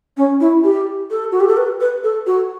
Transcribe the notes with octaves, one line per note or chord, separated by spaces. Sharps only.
C#4
E4
G4
A4
F#4
G4
A4
B4
B4
A4
F#4